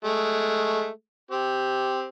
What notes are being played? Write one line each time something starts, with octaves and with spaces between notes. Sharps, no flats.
G#3 A3
C4 G4